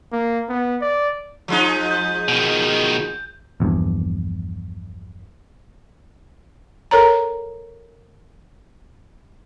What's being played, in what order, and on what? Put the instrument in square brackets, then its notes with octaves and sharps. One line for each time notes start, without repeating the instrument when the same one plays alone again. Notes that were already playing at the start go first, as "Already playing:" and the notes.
[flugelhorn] A#3
B3
D5
[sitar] F3 G#3 D#4
[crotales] G6
[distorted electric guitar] B2 D#3
[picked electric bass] A#1 E2 G2
[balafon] A4 A#4 C#5 A#5